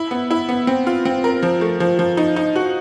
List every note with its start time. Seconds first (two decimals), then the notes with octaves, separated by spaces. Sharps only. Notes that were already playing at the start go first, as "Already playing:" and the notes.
Already playing: E4
0.11 B3
0.31 E4
0.49 B3
0.67 C4
0.87 F4
1.05 C4
1.24 A#4
1.43 F3
1.61 A3
1.80 F3
1.99 F3
2.17 D#4
2.36 D#4
2.56 F#4